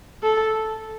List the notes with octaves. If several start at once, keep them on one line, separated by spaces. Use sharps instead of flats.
A4